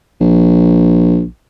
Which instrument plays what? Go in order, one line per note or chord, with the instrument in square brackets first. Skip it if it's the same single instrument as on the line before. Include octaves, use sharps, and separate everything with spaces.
[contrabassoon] A#1